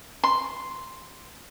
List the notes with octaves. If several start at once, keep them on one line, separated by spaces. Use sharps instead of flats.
C6